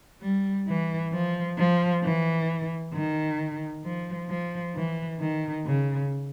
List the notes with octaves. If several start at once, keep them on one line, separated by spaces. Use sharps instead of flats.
G3
E3
F3
F3
E3
D#3
F3
F3
E3
D#3
C#3